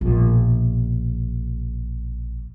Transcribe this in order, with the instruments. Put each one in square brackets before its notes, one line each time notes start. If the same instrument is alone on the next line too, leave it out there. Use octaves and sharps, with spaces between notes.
[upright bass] A#1 B2